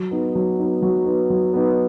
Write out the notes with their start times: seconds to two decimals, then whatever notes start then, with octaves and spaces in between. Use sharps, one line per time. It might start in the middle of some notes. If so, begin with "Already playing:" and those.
Already playing: F#3
0.11 B3 D#4
0.35 F#3
0.59 B3 D#4
0.82 F#3
1.05 B3 D#4
1.30 F#3
1.54 B3 D#4